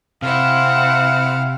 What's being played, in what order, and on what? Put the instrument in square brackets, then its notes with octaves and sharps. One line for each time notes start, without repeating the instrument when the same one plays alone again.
[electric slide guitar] C3 [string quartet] C4 E4 F#5 [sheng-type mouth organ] F5